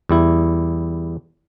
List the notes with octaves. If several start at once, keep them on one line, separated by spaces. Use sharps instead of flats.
E2 G3 E4